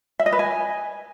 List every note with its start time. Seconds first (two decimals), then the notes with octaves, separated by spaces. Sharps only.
0.19 E5
0.26 D#5
0.32 B4
0.39 G#5